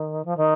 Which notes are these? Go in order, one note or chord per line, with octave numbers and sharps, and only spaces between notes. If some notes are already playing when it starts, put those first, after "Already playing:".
Already playing: D#3
F3
D#3